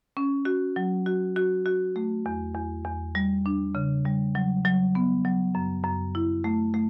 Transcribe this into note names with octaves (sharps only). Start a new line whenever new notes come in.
C#4
F#4
F#3
F#4
F#4
F#4
A3
E2
E2
E2
G3
D4
C#3
G3
F#3
F#3
B3
F#3
F#2
F#2
E4
A3
A3